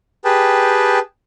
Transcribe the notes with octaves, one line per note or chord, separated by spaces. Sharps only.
G4 G#4 B4 G5 A5